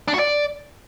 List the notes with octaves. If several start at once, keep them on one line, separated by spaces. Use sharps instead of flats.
D4
F#4
D5